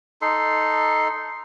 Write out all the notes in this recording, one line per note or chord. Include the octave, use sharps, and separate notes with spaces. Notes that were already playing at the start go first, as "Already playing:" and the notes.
D#4 A4 C6